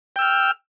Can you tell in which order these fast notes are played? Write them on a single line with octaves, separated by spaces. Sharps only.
G5 E6 F6